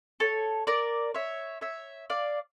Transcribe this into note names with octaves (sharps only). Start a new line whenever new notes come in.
A4 C#5
A#4 D5
C#5 E5
C#5 E5
D5 F5